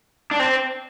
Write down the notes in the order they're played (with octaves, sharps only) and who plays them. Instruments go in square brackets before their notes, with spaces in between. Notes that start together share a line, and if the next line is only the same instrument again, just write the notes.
[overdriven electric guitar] D4
C4